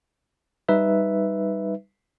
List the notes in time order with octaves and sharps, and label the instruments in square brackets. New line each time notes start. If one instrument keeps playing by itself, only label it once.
[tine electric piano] G3 D#4 B4 E5